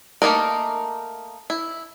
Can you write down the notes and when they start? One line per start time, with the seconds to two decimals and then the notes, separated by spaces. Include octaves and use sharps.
0.22 A3 A#3 C#4 D#4 A#4
1.50 E4